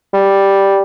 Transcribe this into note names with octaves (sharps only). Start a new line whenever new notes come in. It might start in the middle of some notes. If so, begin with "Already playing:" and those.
G3